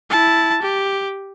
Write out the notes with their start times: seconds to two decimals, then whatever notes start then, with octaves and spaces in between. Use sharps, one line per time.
0.10 E4 A5
0.62 G4